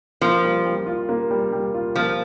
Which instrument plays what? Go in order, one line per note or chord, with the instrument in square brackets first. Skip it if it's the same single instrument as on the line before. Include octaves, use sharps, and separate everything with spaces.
[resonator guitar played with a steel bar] F3 [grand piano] A#3
[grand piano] G3
G3
F4
A#3
G3
G3
F4
[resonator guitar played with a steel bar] F3 [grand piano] A#3